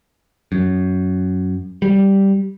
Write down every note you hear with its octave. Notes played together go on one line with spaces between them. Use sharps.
F#2
G3